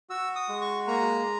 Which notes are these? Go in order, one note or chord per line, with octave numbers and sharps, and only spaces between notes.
F#4 E6
D#6
G#3
C#6
A#3 A#5